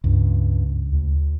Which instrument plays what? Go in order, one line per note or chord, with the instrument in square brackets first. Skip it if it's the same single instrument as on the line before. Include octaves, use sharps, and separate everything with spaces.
[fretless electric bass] C#2 [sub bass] G2
[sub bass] D2